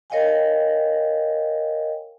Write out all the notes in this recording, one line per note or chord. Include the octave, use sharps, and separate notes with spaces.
A#4 C#5 D#5 F5 G5 G#5